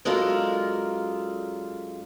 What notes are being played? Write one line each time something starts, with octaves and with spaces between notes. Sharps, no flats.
F#2 G#3 D4 F4 A4 A#4